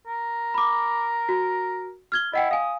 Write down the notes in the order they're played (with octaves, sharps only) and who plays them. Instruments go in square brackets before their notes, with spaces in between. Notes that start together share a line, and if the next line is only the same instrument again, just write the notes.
[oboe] A#4
[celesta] B5 D6
F#4
F6 G#6 G7
[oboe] E4 [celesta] D#5 F#5 G5
[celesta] F5 G#5 [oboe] D#6